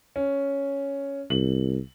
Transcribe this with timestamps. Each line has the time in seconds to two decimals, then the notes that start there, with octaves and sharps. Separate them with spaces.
0.16 C#4
1.30 C2 F#7